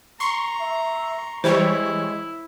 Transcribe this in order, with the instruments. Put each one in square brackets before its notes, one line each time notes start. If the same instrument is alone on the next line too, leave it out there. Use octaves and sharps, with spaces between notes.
[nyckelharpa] A#5 [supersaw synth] C6 C#6
[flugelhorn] E5
[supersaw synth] E3 G3 C#5 [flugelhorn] G#3 [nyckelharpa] E4 [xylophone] C5